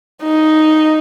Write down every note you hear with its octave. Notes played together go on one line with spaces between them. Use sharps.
D#4